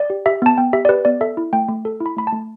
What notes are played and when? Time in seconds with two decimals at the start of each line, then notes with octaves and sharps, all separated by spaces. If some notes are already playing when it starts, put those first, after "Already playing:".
Already playing: D5
0.10 G4
0.26 G4 E5
0.42 B3 A5
0.58 B3 G5
0.73 G4 E5
0.85 D5
0.89 G4 B4
1.05 B3 D5
1.21 A4 E5
1.37 E4
1.53 A3 G5
1.69 A3
1.85 A4
2.00 E4
2.06 B5
2.17 A3 B5
2.27 A5
2.33 A3